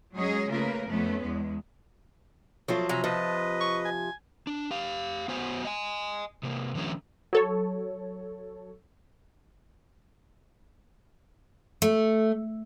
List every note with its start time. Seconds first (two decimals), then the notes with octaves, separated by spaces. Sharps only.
0.15 F#3 G#3 C#4 G#4 C#5 D#5
0.48 C#3 A3 A#3 F4 A#4 B4
0.85 F2 A3 B3 C#4 B4
1.22 E2 G#3
2.68 F3 F#3 A3 F4
2.89 C3 G#5 A#5 B5
3.04 F3 B4 D#5 A5
3.61 C#6
3.85 G#5
4.47 D4
4.71 G4 F5
5.28 B3 F#4 C5 G#5
5.65 D#5 G#5
6.43 C3 A#3
6.75 D3 E3 F#3 A3 C#4
7.33 F#3 A4 C#5
11.82 A3